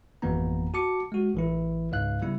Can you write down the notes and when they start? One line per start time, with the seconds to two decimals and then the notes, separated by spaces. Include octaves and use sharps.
0.22 G#1 F2 E3 A#3 B3 A#5
0.74 F#4 A5 D6 C#7
1.12 G#3 F#4
1.34 A1 E3 E4
1.92 C#2 G#2 F5 F#6
2.22 C#3 G3 B3 E4